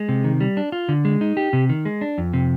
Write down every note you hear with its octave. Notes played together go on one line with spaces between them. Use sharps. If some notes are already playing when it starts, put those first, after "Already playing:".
Already playing: G#3
C3
D#3
G3
D4
F4
D3
G#3
D#4
G4
C3
D#3
G#3
D4
F2
C3